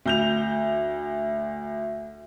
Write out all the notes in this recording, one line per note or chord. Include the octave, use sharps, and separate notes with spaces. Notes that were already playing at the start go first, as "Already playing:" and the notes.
D2 G6 F7